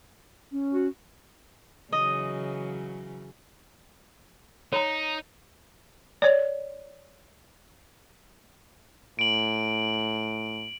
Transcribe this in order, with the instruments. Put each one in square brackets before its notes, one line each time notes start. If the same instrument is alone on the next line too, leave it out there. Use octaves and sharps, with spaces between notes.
[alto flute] C#4
[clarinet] F#4
[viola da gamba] C#3 E3 F#3 [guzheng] D#5
[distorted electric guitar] D#4 [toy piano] C#5 A#5
[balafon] C#5 D5
[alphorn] A2 [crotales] D7 F#7